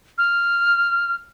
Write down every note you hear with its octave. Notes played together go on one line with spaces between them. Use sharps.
F6